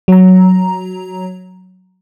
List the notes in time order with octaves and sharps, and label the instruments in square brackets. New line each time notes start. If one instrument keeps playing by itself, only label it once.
[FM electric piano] F#3 A#5